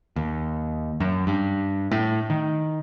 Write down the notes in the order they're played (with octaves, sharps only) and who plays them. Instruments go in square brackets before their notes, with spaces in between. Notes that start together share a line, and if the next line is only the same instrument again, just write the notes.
[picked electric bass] D#2
F#2
G2
A2
D#3